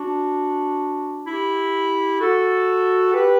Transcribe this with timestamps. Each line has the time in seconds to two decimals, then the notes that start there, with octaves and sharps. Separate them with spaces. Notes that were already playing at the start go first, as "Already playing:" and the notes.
Already playing: D4 F#4
1.27 E4 G4
2.21 F#4 A4
3.14 G4 B4